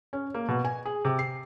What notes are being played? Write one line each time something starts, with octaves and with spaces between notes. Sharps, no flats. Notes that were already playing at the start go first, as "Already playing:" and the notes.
C#4
A#3
B2
G#5
G#4
C3
C7